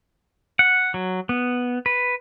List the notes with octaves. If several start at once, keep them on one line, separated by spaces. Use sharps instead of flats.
F#5
F#3
B3
B4